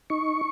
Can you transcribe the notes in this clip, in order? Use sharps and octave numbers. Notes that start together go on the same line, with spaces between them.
D#4 C#6